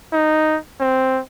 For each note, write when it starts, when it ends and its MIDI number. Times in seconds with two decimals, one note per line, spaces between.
0.13 0.58 63
0.80 1.20 60